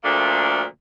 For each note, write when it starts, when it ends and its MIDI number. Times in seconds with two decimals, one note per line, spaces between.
0.04 0.63 38
0.04 0.63 46
0.04 0.63 53
0.04 0.63 57
0.04 0.63 58
0.04 0.63 62